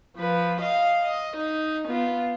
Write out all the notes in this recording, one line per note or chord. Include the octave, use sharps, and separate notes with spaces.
F3 B4
D#5 F5
D#5
D#4
B3 F4